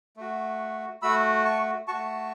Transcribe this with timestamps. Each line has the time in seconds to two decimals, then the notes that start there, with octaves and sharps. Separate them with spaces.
0.17 A3 F#4
1.02 A3 F#4 B5 E6
1.45 A5 C#6
1.88 A3 F#4 A5 C#6